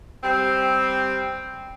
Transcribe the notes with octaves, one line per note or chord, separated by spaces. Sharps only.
G3 C4